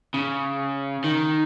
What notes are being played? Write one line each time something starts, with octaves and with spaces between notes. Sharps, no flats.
C#3
D#3